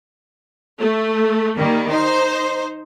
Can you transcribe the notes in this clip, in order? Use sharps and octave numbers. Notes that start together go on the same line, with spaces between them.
A3
D#3 G3 A#3
D#4 C5